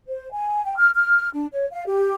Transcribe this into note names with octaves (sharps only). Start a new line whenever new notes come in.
C5
G#5
G5
F6
F6
D4
C#5
F5
G4